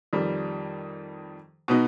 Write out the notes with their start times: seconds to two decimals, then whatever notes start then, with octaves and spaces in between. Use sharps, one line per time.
0.13 F2 D#3 G3
1.68 B2 B3 D#4